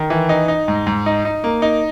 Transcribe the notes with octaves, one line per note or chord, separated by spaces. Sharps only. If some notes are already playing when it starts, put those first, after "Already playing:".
Already playing: D#3
E3
D#4
D#4
G#2
G#2
D#4
D#4
A#3
D#4